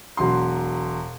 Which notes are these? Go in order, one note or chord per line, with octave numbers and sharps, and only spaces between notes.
E1 F#3 C6